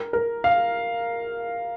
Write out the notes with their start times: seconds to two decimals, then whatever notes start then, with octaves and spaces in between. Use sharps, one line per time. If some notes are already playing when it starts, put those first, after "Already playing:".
Already playing: A#4
0.13 A#4
0.44 F5